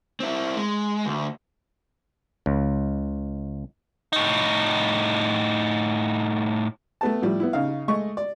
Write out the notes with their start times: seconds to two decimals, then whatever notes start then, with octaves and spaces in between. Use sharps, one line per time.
0.20 C4 E4
0.57 G#3
1.06 D2
2.46 C#2
4.13 A2 D#4
7.01 A3 B3 A5
7.22 A2 F3 G3
7.40 B3 E4
7.53 C#3 D#4 F5
7.88 G#3 A3 D#5 C#6
8.17 D5